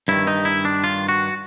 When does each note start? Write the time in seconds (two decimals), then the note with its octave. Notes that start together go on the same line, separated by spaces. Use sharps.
0.08 G2 D#3 E4
0.27 D#4
0.45 E4
0.65 D4
0.84 F4
1.09 F#4